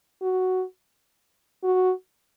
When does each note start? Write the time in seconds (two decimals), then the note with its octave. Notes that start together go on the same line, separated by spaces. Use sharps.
0.22 F#4
1.63 F#4